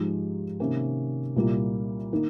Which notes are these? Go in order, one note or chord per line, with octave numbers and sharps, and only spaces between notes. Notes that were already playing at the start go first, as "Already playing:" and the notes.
Already playing: G#2 F3 G#3 D#4 G4
C3 D#3 A#3 C#4
C2 A#2 G3 A#3 F4
D#3 A#3 D#4